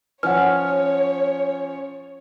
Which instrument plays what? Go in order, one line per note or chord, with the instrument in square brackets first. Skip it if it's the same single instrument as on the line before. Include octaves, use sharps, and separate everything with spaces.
[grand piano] F3 C#4 [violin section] C#5 [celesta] F#5 F6